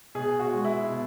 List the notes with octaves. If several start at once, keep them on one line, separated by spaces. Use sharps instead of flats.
B2 G#4
F#4
G#3
E4
B2